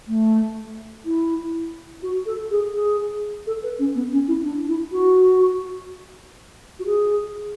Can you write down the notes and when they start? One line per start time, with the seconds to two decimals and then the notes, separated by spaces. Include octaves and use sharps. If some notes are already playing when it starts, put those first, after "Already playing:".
0.08 A3
1.05 E4
2.03 F#4
2.26 A4
2.51 G#4
2.74 G#4
3.47 A4
3.63 B4
3.79 C#4
3.95 B3
4.12 C#4
4.28 E4
4.43 D4
4.68 E4
4.92 F#4
6.79 F#4
6.86 G#4